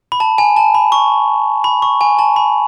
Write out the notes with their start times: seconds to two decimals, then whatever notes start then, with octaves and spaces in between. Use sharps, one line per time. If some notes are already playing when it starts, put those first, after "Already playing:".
0.12 B5
0.20 A5
0.38 G#5
0.56 A5
0.74 B5
0.92 C#6
1.64 B5
1.82 C#6
2.01 G#5
2.19 A5
2.36 B5